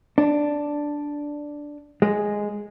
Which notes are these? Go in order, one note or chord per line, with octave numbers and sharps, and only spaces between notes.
D4
G#3